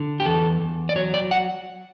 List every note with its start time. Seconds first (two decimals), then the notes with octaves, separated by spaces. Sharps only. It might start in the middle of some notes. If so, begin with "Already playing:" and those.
Already playing: D3
0.20 G4
0.26 E2 A4
0.61 E2
0.89 D5
0.96 F#3 C#5
1.14 D5
1.31 F#5